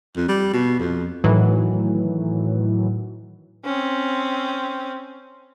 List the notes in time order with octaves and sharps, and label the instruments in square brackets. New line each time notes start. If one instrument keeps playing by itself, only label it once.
[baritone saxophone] F2
G3
B2
F2
[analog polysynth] A2 D#3 E3 F#3
[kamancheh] C4 C#4